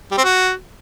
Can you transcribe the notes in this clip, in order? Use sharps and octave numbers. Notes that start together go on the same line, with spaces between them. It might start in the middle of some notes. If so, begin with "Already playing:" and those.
G3
C4
F#4